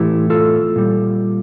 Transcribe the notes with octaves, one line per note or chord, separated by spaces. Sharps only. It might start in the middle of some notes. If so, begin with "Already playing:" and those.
Already playing: A2 E3 A3 E4 G4
F4 A4
A#2 G3